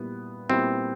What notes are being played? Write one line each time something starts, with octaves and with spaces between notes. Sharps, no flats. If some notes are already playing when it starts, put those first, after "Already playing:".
Already playing: A#2 G3 B3 E4
A#2 G3 B3 C4 E4